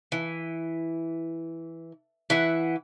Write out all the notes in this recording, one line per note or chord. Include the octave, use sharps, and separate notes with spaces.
E3
E3 E5 F#5